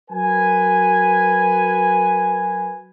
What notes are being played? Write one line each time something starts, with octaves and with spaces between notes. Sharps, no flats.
F#3 A#4 B4 G#5